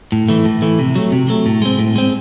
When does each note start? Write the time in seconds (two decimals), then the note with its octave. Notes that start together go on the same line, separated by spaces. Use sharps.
0.12 A2
0.29 E3 A3
0.45 A2
0.62 E3 A3
0.79 C3
0.95 F#3 A3
1.12 C3
1.28 F#3 A3
1.46 A2
1.62 G#3 C4
1.79 A2
1.96 G#3 C4